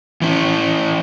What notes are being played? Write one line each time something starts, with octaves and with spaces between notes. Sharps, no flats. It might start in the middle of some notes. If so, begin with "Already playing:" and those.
E3 C#4